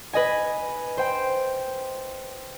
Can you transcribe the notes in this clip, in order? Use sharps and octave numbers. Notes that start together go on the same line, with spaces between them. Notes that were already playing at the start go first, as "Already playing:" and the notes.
B4 D#5 G#5
C5 G5